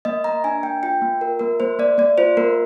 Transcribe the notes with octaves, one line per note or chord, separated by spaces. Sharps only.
A#3 D#5
A#3 A#5
D4 G#5
A#3 G5
F4 G5
A#3
F4 A#4
A#3 A#4
A#3 C5
A#3 D5
A#3 D5
F4 C5
A#3 A#4